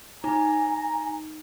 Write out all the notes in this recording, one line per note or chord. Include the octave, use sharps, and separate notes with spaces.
D#4 G#5 A#5